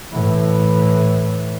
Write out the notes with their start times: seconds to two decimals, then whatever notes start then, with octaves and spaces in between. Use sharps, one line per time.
0.12 A2 E3